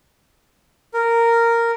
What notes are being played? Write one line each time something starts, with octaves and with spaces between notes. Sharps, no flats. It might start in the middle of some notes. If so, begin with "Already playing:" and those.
A#4